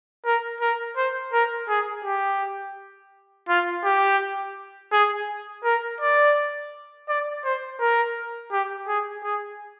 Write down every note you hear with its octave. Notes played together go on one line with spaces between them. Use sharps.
A#4
A#4
C5
A#4
G#4
G4
F4
G4
G#4
A#4
D5
D5
C5
A#4
G4
G#4
G#4